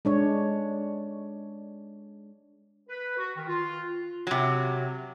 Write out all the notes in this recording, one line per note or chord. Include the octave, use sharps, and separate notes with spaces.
G#3 D4 C#5
B4
F#4
D#3
F4
C3 F#3